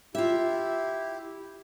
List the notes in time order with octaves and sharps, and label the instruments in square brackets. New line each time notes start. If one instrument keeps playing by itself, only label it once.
[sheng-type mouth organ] E4 G4 [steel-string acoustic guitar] F4 E5